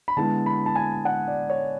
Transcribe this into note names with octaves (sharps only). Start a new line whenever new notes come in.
B5
D3 G#3 B3 E4 A5
B5
A5
G#5
F#5
D5
C#5